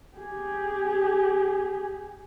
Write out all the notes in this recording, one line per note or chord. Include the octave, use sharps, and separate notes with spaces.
G4 G#4